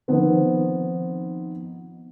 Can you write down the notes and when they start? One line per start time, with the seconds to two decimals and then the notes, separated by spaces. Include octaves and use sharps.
0.08 D#3 F3 B3 C4